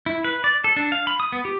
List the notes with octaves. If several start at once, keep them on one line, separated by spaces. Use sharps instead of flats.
E4
B4
D5
A4
D4
F5
B5
D#6
B3
G4